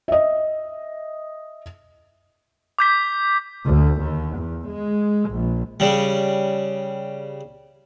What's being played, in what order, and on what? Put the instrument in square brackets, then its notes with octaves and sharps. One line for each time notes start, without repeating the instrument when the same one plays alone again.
[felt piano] D#5 E5
[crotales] D6 G6 B6
[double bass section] D2
D#2
E2
G#3
A#1
[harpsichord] C#3 G3